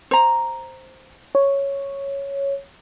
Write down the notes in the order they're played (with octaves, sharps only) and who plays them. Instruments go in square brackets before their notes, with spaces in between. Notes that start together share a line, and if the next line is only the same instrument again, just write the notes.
[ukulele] C5 A#5
[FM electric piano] C#5